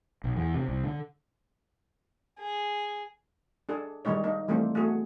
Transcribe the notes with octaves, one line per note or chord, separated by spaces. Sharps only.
B1
E2
C3
C2
D3
G#4
D4 G#4 A4
D#3 G3 G#3 D#4 C#5
A#3 D#4
E3 G3 A3 A#3 C4
A3 B3 F#4 G#4